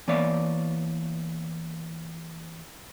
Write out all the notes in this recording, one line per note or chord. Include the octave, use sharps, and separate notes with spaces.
E3 A#3 B3 C#5 D5